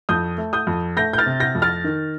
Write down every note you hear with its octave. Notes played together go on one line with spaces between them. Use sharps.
F2 D#6 G6
A3
D#6 G6
F2
A3 G6 A#6
G6
F6 A6
C3
G6 A#6
F2
F6 A6
D#3